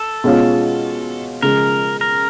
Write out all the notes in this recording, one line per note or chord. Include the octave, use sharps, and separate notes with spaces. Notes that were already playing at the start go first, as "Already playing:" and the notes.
Already playing: A4
B2 G#3 C#4 F4
C#3 F3 G#3 A#4
A#4